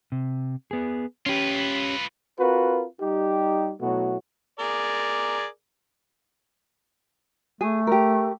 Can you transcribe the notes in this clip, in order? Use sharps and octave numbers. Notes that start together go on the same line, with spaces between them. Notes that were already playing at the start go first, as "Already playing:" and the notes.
C3
B3 G#4
C#4 F4 G4 B4
C4 F4 F#4 A#4 B4
G3 D#4 G4
B2 F#3 A3 B3 E4 F#4
G#4 A#4 D5
A3 G#4
G4 A#4